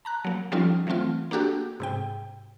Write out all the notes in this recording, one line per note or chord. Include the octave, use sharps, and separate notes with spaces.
A5 A#5 F#6
F#3 A#3
F3 G3 C#4 D#4 F4 A4
E3 F#3 A3 C4 F4
A#3 D4 F#4 G4 A4
G#2 C3 G5